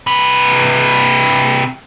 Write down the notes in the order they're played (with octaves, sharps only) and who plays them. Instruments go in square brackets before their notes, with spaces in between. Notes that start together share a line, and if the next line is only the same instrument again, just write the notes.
[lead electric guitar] C3 B4